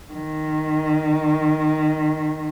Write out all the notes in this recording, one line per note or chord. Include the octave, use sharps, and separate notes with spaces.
D#3